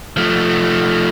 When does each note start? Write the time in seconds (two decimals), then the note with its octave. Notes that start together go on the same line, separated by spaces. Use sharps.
0.17 F3 A3